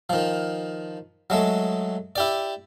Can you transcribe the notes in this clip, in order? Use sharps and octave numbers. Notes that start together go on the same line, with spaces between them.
D#3 F3
F#3 G#3 A3
E4 G4 D5